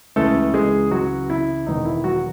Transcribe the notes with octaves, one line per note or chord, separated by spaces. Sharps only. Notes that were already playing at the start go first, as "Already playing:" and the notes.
C#2 C#3 E3 G#3 A3 A4
G#3 G#4
F#3 F#4
E4
E1 E2 D#3 D#4
E4
F#3 F#4